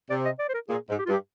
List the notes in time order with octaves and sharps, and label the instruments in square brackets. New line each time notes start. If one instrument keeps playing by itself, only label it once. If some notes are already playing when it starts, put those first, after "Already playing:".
[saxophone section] C3 [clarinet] D5
[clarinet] D#5
D5
C5
A#4
[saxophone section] A#2 [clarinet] G#4
[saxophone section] G#2
[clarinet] G4
F4
[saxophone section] G2
[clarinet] G4